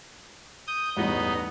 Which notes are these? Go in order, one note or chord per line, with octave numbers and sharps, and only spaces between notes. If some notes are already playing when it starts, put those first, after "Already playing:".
D#6 G6
A1 E2 G2 B3 D#4